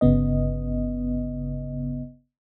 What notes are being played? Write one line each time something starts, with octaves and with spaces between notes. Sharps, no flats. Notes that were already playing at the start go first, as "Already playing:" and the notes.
G1 C#3 B3 D#5